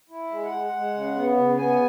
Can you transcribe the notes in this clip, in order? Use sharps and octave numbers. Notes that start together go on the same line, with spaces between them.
E4
G#3
F#5
G#3
G#3
C#3
B3
C#3
B3 G#5